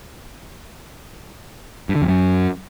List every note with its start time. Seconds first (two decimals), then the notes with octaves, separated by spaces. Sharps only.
1.89 G2
1.96 D3
2.02 F2
2.08 F#2